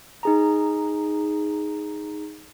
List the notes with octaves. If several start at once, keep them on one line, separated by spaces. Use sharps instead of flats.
D#4 G#4 A#5